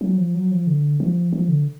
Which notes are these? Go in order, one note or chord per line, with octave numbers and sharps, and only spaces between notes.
F#3
F3
F#3
F3
D3
F3
F3
D3